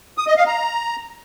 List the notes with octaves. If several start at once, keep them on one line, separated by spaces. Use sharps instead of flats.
D#6
D#5
F5
A#5